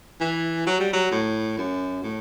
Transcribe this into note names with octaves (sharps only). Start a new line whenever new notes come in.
E3
F#3
G3
F#3
A2
F#2
A2